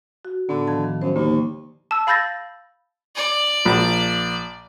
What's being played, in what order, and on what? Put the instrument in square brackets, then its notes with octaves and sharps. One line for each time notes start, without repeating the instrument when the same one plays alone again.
[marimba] F#4
[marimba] A2 B3 [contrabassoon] D3
[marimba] D#3 F3 A5
D#3
[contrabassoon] F#2 [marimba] C5
[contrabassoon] D#2 [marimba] D3 G3 A#3
[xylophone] A5 E6
F5 B5 E6 G6 A6 A#6
[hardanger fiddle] D5
[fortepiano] A#1